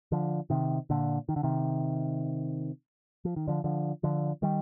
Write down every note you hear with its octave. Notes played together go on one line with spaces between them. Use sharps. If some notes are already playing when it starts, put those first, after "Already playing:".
D3 F3
C3 D#3
A#2 D3
D#3
D3
C3 D#3
F3
D#3
D3 F3
D3 F3
D3 F3
D#3 G3